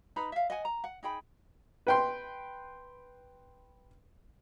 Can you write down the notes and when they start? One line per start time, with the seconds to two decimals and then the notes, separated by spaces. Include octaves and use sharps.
0.16 D#4 B4 A#5 B5
0.32 E5 F5
0.50 D#5 F#5 G#5
0.65 A#5
0.84 F#5
1.03 D#4 G#4 G5 B5
1.87 B4 G5 C6